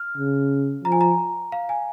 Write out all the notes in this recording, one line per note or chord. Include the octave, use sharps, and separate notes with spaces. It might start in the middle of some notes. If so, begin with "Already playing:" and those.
Already playing: F6
C#3
F3 A#5
G#5
A#5
F5
G#5